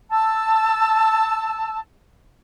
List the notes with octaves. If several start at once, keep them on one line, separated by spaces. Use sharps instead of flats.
A5 E6